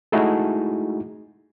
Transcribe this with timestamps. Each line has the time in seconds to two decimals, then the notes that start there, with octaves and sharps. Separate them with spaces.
0.12 G#3 A3 D#4 E4 F#4 G#4